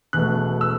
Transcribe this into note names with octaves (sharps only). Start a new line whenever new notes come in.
E1 E2 B2 A3 F#6
E6